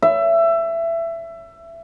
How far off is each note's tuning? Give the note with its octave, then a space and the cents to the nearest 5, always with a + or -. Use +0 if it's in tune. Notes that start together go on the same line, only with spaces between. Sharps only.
E5 +20